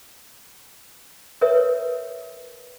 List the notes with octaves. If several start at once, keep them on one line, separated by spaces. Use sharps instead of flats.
A#4 B4 C#5 E5